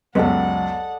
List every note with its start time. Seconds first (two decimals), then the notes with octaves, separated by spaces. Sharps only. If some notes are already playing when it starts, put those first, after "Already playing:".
0.15 C#2 F#2 B3 A4 D5 D#5 F#5